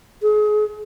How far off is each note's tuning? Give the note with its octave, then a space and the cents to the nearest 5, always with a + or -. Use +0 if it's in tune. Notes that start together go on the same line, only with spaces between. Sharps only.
G#4 +30